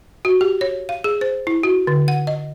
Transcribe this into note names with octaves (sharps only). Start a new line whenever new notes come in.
F#4
G4
C#5
F5
G#4
C5
E4
F#4
D3
F#5
D#5